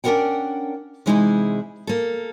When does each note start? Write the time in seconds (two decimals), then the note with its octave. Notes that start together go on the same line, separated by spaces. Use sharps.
0.04 C#4 D4 F#4 A#4 F#5 G5
1.06 C3 E3 G#3 D#4 E4 G#4
1.87 A#3 A4